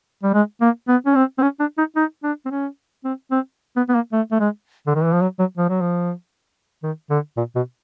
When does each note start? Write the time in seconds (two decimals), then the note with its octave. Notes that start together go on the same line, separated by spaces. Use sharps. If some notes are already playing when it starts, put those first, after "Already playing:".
0.23 G3
0.34 G#3
0.62 A#3
0.88 B3
1.06 C#4
1.15 C4
1.39 C4
1.42 C#4
1.60 D4
1.78 D#4
1.96 D#4
2.24 D4
2.46 C4
2.51 C#4
3.05 C4
3.31 C4
3.77 B3
3.89 B3
3.95 A#3
4.13 A3
4.32 A3
4.40 G#3
4.87 D3
4.95 D#3
5.04 E3
5.13 F3
5.22 F#3
5.39 F#3
5.58 F3
5.69 F#3
5.81 F3
6.83 D#3
7.10 D3
7.37 A#2
7.56 B2